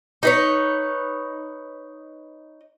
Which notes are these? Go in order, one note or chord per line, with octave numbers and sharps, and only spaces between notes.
D#4 B4 C#5